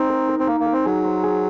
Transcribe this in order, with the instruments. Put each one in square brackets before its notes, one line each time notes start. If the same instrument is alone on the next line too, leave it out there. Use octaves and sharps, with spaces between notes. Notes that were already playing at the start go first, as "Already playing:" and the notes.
Already playing: [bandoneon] C4 [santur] D#4
[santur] A#4
A#4
[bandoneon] C4
[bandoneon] A#3 [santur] A#4
[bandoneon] A#3
[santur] A#4
[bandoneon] C4
[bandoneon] F#3 [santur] G#4
[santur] C5
G#4